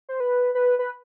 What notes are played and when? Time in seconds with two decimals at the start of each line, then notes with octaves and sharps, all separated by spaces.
0.09 C5
0.20 B4
0.55 B4
0.79 B4